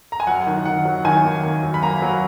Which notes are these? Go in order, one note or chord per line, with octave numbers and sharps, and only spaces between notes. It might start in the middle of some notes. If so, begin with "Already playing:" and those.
A#5
G#5
F#2 F#5
D#3
D#3 F#5
F#3
D#3 G#5
A#3
D#3
F#2
B5
A#3 A#5
F#3